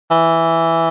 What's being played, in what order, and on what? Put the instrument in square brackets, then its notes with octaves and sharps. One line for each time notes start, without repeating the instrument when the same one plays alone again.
[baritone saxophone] E3